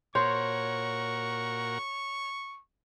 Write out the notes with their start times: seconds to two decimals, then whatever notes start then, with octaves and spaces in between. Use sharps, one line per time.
0.15 A#2 F#4 A#4 C5 C#5 C#6